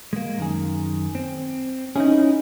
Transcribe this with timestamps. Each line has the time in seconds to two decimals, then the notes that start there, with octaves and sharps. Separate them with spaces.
0.13 G#3 A#3
0.38 F#2 D#3 G#4
1.15 C4
1.96 C#4 D#4 E4 G#4